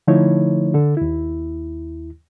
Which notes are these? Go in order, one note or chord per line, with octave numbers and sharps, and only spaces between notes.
D3 F3 A3 D#4 E4 C#5
D3 A4
D#2 E4